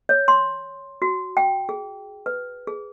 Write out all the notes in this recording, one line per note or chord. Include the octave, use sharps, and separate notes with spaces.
C#5
C6
F#4
G5
G#4
B4
G#4